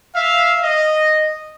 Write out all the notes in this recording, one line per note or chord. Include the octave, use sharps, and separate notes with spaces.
E5 F5
D#5